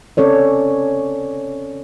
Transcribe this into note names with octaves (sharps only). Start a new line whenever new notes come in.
C4 C#4 A4 C#5 D5